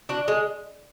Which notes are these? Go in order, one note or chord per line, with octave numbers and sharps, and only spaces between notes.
D4 F#4
G#3